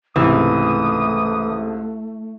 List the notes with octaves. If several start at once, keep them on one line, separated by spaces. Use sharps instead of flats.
C#2 G#2 C3 E3 A3 D#6